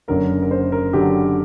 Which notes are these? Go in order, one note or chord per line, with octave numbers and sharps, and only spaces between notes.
F#1 F#2 D3 F#3 A#4
A#4
C5
A#4
D3 F#3 G4